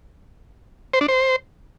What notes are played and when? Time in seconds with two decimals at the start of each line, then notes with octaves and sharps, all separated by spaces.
0.94 C5
1.01 D4
1.08 C5